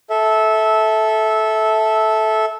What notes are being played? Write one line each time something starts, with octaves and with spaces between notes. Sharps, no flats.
A4 E5